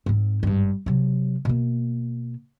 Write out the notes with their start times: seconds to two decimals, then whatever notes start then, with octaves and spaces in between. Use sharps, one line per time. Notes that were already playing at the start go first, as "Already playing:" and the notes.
0.06 G#2 C4
0.43 G#1 G2
0.86 C3 F#3
1.45 B2 A#3